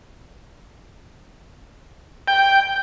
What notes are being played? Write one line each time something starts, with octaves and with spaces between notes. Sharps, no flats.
G5